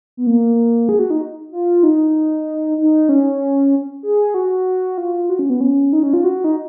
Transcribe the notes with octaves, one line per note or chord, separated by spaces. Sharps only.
B3
A#3
G#4
F#4
D#4
F4
D#4
D#4
C#4
G#4
F#4
F4
F#4
C#4
B3
C#4
D#4
C#4
F4
F#4
D#4